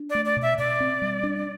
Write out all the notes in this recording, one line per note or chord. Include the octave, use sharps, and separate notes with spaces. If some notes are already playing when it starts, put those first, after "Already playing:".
Already playing: D4
A3 D5
D5
B2
E5
B2 D5
C4
G3
D4